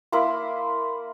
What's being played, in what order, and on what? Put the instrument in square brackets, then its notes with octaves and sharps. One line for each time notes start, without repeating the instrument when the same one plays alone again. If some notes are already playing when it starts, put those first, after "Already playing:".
[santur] A#3 E4 B5 C6